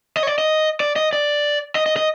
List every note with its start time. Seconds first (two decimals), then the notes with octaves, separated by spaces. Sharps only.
0.17 D#5
0.23 C#5
0.27 D5
0.38 D#5
0.80 D5
0.96 D#5
1.13 D5
1.75 D#5
1.86 D#5
1.96 D#5